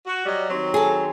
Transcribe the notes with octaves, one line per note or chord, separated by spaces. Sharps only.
F#4
F#3 G3 D#5
D#3 F#3 C4
G#4 A4